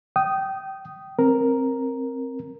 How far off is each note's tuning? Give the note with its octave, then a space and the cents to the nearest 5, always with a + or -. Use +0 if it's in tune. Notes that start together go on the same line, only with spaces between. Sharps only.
G5 -20 D#6 +0
C4 +15 A#4 +0